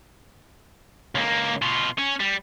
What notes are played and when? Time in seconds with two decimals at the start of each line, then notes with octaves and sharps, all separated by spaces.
1.15 C#2 A#3
1.62 B2 F4
1.98 C#4
2.20 G3